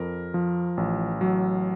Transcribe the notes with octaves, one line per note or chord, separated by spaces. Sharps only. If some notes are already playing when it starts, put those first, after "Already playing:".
Already playing: F2 A#4
F3
A1
F#3